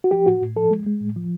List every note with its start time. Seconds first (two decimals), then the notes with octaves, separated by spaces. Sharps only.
0.04 F#4
0.11 F3 G4
0.26 A2 F#4
0.41 A2
0.56 F3 A4
0.71 G#3
0.86 G#3
1.01 A2
1.16 F3